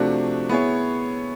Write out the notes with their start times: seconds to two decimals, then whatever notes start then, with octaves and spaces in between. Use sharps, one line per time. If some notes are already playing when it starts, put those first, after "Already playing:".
Already playing: C3 F3 A3 D4 F#4
0.49 B3 E4 G#4 C#5